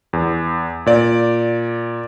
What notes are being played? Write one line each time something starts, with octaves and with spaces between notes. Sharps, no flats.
E2
A#2 D5